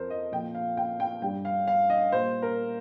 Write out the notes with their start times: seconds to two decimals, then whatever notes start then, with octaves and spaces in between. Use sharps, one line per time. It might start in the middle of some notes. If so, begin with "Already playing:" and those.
Already playing: F2 F3 A#4 C5
0.10 D#5
0.32 A#2 F3 G5
0.55 F5
0.77 G5
1.00 G5
1.22 G2 G3 G5
1.45 F5
1.67 F5
1.90 D#5
2.12 A#2 G3 C5
2.42 A#4